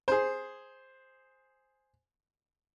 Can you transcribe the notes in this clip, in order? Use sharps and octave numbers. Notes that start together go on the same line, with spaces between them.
G#4 C5